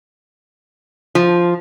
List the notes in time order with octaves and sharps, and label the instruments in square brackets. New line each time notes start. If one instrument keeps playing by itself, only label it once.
[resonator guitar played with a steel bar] F3